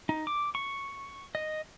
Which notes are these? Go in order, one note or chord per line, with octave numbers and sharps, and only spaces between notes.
D#4
D6
C#6
D#5